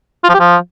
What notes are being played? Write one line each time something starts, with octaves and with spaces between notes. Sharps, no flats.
F4
F3
G4
F3